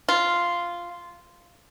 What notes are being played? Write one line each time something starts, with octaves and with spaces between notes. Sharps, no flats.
F4